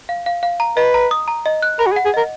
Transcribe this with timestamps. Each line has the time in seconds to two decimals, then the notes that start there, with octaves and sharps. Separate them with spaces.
0.09 F5
0.26 F5
0.43 F5
0.60 A#5
0.76 B4 D#5
0.94 A#5
1.11 D#6
1.28 A#5
1.46 D#5
1.62 F#6
1.79 A#4 B5
1.86 F#4
1.92 G#4
1.96 F#5
2.05 G#4
2.14 A#4 D#5